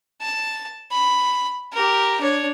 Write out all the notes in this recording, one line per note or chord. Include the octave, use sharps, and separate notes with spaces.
A5
B5
G4 A#4
D4 C#5